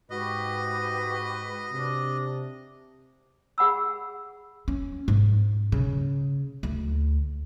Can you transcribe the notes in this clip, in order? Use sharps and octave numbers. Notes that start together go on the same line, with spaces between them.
G#2 F#4 G4 B4 D#5
C3 D4
G#4 F#5 B5 E6
C#4
G#2
C#3
D2